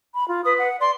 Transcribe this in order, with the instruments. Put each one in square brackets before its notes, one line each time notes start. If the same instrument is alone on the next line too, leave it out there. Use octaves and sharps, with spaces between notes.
[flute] B5
F4
[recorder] B4 [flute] D#6
[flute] F#5
[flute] D5 [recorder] C6